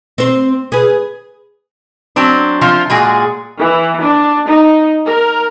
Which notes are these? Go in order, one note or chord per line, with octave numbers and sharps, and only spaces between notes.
C4 C5
G#4 B4
F#3 C4 D4
C3 F3 F4
A#2 G#3 F#4 G#4
E3
D4
D#4
A#4